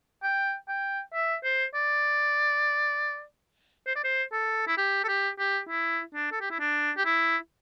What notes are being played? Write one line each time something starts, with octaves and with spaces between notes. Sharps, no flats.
G5
G5
E5
C5
D5
C5
D5
C5
A4
E4
G4
A4
G4
G4
E4
D4
A4
G4
E4
D4
G4
E4